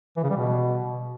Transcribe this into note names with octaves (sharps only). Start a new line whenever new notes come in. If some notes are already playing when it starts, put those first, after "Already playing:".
E3
C#3
G3
B2